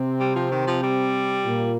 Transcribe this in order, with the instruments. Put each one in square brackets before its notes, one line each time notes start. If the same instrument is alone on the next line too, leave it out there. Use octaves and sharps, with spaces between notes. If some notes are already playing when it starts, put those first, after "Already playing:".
Already playing: [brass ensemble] C3 C4
[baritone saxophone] G3
F3
D#3
F3
G3
[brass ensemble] A#2 A#3